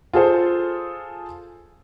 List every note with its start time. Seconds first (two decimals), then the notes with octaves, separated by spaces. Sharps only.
0.13 F4 G#4 A4 C5